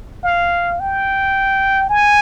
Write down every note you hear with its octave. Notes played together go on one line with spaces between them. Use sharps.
F5
G5
G#5